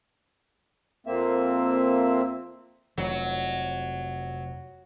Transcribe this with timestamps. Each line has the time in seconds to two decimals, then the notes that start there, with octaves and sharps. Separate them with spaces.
1.07 F2 A#3 C4 E5
2.98 F1 F#3